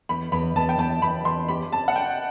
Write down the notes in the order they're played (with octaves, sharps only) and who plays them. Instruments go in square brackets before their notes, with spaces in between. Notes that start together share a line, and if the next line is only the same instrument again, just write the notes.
[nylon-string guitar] E2 [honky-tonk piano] B5
[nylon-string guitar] E2 [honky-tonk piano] B5
[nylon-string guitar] E2 [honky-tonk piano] A5
[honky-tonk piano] G5
[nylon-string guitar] E2 [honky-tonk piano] A5
[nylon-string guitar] E2 [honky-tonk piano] B5
[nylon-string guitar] E2 [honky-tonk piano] C6
[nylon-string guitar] G4 [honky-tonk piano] B5
[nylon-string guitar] C4 [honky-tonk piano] A5
[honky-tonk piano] F#5
[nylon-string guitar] D5 [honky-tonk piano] G5